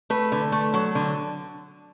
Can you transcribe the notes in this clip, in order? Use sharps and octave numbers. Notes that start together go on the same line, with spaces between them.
A3 B4
D3
A3
F#3
D3